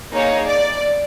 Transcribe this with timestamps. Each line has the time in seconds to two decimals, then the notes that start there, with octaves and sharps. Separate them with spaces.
0.12 A#3 D#4 G#4 C#5
0.47 D5